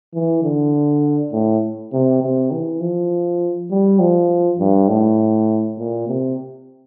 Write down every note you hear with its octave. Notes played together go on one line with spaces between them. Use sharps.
E3
D3
A2
C3
C3
E3
F3
G3
F3
G2
A2
A#2
C3